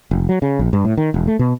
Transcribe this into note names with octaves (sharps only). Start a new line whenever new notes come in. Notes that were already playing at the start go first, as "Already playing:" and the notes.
F1
F#3
C#3
A#1
G2
A2
D#3
E1
A3
B2